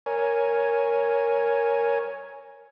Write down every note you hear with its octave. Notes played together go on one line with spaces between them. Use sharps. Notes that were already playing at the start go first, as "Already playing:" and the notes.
A#4 C#5 G#5